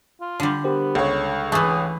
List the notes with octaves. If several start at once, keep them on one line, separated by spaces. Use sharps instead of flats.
F4
D3 G3
B3 G4 A#4 C5
C#2 A4 C#5
E3 A3 G#4